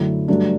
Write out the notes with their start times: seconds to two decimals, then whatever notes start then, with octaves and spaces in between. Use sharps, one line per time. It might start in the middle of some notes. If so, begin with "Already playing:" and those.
Already playing: F#2 D3 A3 E4
0.28 G2 F#3 A3 D4